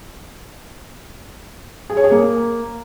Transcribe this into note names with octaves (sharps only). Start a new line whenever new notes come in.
G#4
C#5
G#4
A#3